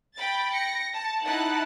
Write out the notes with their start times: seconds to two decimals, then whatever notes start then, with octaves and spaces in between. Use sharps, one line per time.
0.15 G5 B5 A6
0.54 A#6 C#7
0.93 A5
1.26 D#4 E4 F#5 A5 F#6